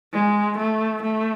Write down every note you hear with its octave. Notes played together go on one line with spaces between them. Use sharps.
G#3
A3
A3